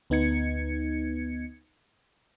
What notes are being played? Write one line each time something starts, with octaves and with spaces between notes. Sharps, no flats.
D2 B3 D#4 G#6 C#7